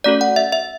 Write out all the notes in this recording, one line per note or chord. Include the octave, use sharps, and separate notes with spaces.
A3 C#4 F#4 A4 D5
F#5
E5
E5